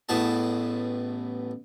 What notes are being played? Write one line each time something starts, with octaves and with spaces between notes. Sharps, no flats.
A1 A2 B3 G#4 A5